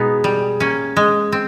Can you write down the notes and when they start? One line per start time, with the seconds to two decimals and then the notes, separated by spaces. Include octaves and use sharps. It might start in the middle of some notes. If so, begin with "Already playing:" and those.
Already playing: B2 G#3 B3 D#4
0.24 G3
0.60 A#3 C#4
0.97 G#3
1.32 C4